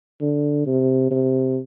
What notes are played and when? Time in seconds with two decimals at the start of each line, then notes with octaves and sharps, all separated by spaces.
0.21 D3
0.66 C3
1.11 C3